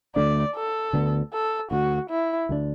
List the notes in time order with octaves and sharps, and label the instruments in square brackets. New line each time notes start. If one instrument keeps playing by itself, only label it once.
[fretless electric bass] D2 D3 A3 D4 [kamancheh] D5
[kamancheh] A4
[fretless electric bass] D2 D3 B3 D4
[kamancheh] A4
[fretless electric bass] D2 D3 A3 [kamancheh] F#4
[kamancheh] E4
[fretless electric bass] D2 D3 A3 D4